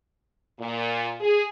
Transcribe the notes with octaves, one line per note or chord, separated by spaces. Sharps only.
A#2
G#4